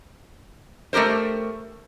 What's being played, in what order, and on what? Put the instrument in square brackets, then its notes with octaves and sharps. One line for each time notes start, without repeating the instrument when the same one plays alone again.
[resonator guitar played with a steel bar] A3 D#4 G4 A#4 C5